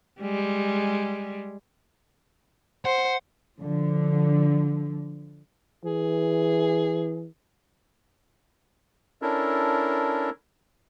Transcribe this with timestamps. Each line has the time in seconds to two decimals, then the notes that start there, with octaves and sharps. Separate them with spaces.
0.21 G3 G#3
2.85 C5 F#5
3.58 D3 F3
5.84 E3 G#4
9.22 C#4 D4 E4 A4 A#4